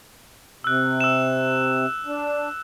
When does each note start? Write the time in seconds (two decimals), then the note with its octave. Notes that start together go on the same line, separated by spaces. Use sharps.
0.64 C3 E6 F#6
1.00 E6 E7
2.06 D4